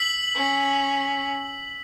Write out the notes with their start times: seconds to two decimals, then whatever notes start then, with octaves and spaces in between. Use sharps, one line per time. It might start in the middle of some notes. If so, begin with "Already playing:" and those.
Already playing: E6 B6 F#7
0.35 C#4